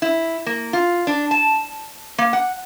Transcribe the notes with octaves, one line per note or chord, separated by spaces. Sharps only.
E4
A#3
F4
D4
A5
A#3
F#5